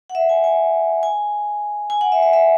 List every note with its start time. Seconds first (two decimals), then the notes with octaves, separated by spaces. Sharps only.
0.10 F#5
0.15 E5
0.29 G#5
0.44 G#5
1.03 G#5
1.90 G#5
2.01 F#5
2.12 E5
2.22 E5
2.33 E5